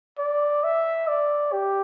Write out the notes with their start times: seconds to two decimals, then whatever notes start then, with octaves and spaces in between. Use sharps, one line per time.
0.19 D5
0.64 E5
1.08 D5
1.52 G4